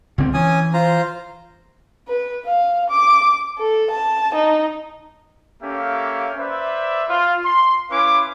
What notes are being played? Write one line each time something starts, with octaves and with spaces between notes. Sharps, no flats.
C#2 D3 C4
E3 C#4 G#5 D#6
F4 C5 A#5
B4
F5
D6
A4
A5
D#4
A#3 C#4 G4 A4 E5 F5
B4 C5 D5 E5
F4
C6
C#4 E4 B4 F5 C6 D6